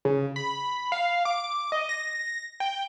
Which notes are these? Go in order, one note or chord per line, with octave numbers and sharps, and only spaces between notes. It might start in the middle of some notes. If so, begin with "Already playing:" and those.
C#3
B5
F5
D6
D#5
A#6
G5